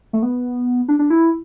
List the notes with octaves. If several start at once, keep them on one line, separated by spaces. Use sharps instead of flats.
A3
B3
D4
D4
E4